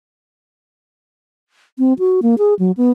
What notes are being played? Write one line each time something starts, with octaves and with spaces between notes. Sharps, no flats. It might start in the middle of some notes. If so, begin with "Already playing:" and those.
C4
F#4
A#3
G#4
F#3
B3